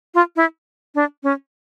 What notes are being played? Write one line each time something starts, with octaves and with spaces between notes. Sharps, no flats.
F4
E4
D4
C#4